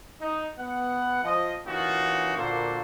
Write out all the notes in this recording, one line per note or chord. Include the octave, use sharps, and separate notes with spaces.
D#4
B3 F#5
F3 D#5
E3 A#3 C#4 D#4 F4 F#4
A#2 D3 A#3 F#4 A4 C5